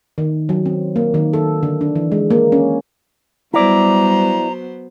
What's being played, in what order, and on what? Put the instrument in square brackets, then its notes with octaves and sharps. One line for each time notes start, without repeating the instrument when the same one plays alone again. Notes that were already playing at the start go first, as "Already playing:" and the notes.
[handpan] D#3
F#3
C4
A#3
D#3
A4
D3
D4
E3
G#3
A#3
C#4
[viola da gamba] F#3 B3 C5 [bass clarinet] G3 [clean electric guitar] E4 D5 [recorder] A#5